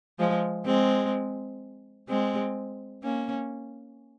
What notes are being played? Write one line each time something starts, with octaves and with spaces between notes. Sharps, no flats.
F3 G#3
G#3 C4
G#3 C4
A#3 C#4